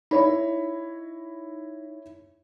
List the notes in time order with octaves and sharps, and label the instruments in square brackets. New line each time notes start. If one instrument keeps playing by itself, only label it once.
[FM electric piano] D#4 [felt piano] E4 C#5 B5